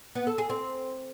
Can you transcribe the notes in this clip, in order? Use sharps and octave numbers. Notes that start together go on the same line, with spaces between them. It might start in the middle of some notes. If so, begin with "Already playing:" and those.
B3
A4
G#4
C4